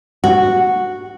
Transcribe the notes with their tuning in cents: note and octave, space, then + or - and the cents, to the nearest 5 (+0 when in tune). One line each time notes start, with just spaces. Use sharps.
F#4 -5